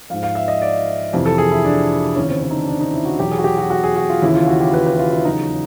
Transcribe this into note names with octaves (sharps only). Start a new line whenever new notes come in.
G#2 F3 F5
F5
E5
D#5
D5
F2 C3 E3
A4
G#4
E4
D4
D#2 C#3 E3 C#4
C4
C#4
D#4
D4
D4
D#4
E4
F#4
E2 B2 F#3 G4
G#4
F#4
G4
F#4
F#4
G#4
F#4
F4
D#2 C#3 E3 E4
F4
F#4
G4
B4
B4
E4
F4
E4
E2 C#3 F#3 D#4